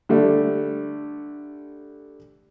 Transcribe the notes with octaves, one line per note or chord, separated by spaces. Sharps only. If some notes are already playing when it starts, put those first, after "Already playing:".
D3 G3 A3